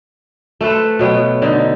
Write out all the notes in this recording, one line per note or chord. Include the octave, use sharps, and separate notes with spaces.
A3 A4 B4 C5
B2 F#3 B3 G5
D3 D#4